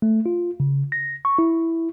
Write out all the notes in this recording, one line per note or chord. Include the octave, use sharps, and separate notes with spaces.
A3
F4
C#3
A#6
C#6
E4